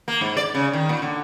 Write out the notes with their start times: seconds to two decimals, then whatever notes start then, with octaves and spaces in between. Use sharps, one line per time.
0.08 A#3
0.21 G#2
0.37 D5
0.55 C#3
0.73 D#3
0.89 A#2
1.02 D3